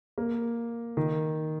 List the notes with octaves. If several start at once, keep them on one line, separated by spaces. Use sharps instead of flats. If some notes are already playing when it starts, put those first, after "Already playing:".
A#3
D#3